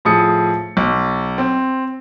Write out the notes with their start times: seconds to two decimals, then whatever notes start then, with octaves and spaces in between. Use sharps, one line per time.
0.05 A2 F3 G#4 D#6 C#7
0.77 B1
1.38 C4